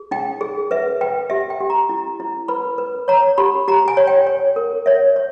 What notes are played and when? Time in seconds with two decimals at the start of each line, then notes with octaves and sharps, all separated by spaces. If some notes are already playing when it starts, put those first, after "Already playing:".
Already playing: G#4
0.11 D#4 G5
0.41 G#4
0.71 B4 E5
1.01 B4 G5
1.30 G4 E5
1.50 G5
1.61 G4
1.70 A#5
1.89 E4
2.20 E4
2.48 B4 B5
2.78 B4
3.08 C#5 A#5
3.38 G4 B5
3.68 G4 A#5
3.88 G#5
3.97 C#5
4.07 G5
4.27 C#5
4.56 A#4
4.86 C#5 E5
5.16 C#5